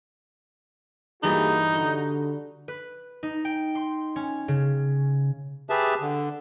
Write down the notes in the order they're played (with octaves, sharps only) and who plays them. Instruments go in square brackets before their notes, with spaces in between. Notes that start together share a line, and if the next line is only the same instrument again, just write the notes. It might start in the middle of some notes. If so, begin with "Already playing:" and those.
[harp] G2 E3 [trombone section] A#3 F#4 G#4 [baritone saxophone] D#4
[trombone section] D3 [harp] F#4
[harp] B4
D#4
G5
C6
C#4
C#3
[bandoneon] G4 G#4 B4 E5 A5
D3